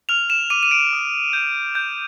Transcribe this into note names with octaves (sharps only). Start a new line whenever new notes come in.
F6 F7
E7
D6 D#7
D#7
D7
D#6
G6
G6